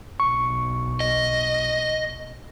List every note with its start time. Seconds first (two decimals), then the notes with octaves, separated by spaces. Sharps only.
0.20 B1 C#6
1.00 D#5